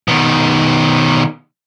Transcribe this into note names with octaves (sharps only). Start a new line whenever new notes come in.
B2 D#3